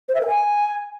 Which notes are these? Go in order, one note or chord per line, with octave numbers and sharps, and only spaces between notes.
C5
E5
A#4
G#5